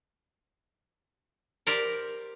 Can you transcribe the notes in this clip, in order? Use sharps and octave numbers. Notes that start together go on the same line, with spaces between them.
G4 A#4 C5 D5 G5